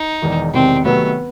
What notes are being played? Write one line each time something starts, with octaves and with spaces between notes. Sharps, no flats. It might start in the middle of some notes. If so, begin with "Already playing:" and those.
Already playing: D#4
E1 E2 D#3
E1 E2 C3 D#3 C4
C3 D#3 F#3 A3 B3